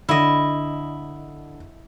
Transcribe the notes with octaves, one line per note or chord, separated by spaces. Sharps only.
D3 E4 D#5